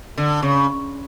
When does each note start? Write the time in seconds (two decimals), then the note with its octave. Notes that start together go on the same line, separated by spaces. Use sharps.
0.18 D3
0.42 C#3